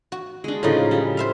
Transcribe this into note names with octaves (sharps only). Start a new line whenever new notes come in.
F#4
G#3 D4
A2 C#3 F3 D#4
G3
C5 E5 F5